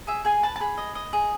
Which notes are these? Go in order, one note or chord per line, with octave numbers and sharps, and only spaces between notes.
G#4 E5
G#4 G#5
B4 A5
A5
G#4 B5
D#5
D#5
G#4